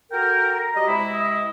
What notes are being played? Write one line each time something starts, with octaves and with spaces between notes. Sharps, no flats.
F#4 A4 A#4 G5
A#5
G3 F#4 D#5
C3 G#3 E4 B5
D#5